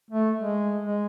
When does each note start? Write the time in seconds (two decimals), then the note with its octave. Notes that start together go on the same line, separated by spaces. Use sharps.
0.10 A3
0.39 G#3
0.83 G#3